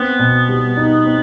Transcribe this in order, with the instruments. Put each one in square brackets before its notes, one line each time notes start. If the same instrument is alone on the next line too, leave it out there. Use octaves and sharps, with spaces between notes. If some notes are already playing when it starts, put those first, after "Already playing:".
Already playing: [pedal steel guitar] B3 [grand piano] C4
[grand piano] B2
G3
D#4
C4